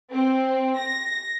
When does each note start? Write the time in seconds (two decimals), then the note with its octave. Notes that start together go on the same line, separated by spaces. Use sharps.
0.12 C4
0.78 A#6